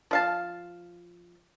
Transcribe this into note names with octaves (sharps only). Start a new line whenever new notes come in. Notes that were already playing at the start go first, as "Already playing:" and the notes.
F3 F5 A5